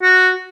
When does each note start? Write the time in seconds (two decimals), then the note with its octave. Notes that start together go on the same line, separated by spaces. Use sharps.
0.03 F#4